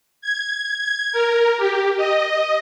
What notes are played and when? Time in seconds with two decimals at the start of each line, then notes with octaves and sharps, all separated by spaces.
0.22 G#6
0.78 G#6
1.12 A#4
1.57 G4
1.97 D#5